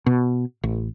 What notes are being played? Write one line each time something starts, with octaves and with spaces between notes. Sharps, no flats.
B2
A1